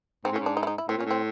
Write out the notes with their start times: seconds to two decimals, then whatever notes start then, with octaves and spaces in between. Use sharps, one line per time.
0.24 G#2 C4
0.32 A2
0.36 C#4
0.40 G#2
0.46 D4
0.57 D#4
0.63 E4
0.67 D#4
0.78 E4
0.88 A2 C4
0.97 A#2 C#4
1.05 A2
1.11 C4